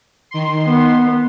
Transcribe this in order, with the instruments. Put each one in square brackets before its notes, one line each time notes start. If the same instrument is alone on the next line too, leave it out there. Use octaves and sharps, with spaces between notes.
[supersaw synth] D#3 C6
[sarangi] B3